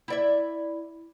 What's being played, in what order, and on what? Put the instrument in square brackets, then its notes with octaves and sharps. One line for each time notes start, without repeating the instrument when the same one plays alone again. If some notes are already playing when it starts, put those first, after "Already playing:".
[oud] E4 D5 E5